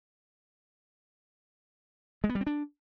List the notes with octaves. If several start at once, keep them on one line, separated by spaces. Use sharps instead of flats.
G#3
B3
G3
C4
D4